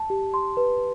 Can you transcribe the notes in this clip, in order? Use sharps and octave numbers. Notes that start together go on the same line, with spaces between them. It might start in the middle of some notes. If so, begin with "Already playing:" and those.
Already playing: A5
G4
C6
B4